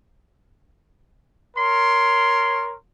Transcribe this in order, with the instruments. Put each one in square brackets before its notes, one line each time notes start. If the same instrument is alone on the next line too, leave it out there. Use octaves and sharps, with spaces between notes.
[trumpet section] A#4 C#5 C6